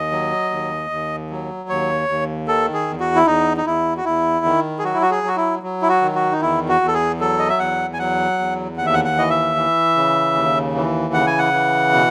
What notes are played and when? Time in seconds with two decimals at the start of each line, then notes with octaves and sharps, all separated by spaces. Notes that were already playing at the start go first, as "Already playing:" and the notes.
Already playing: D#2 D#5
0.11 F#3
0.51 D#2
0.90 D#2
1.30 F#3
1.69 D#2 C#5
2.08 D#2
2.48 D#3 A4
2.74 G#4
2.88 E2
3.00 F#4
3.15 E4
3.27 E2 D#4
3.57 D#4
3.66 E2 E4
3.97 F#4
4.05 E2 E4
4.45 D#3
4.79 G#4
4.83 F#3 F#4
4.94 E4
5.02 F#4
5.11 G#4
5.23 F#3 F#4
5.37 E4
5.63 F#3
5.82 E4
5.89 F#4
6.02 D#3
6.15 F#4
6.32 D#4
6.41 E2 E4
6.68 F#4
6.81 E2
6.88 A4
6.94 G#4
7.20 F#3 A4
7.39 D#5
7.49 E5
7.59 E2 F#5
7.93 G#5
7.99 F#3 F#5
8.39 E2
8.77 D#2 F#5
8.86 E5
8.94 F#5
9.05 F#5
9.16 E3 D#5
9.30 E5
9.56 E3
9.96 C#3
10.35 D#2
10.75 E3
11.13 C#3 F#5
11.27 G#5
11.39 F#5
11.53 E3
11.93 B2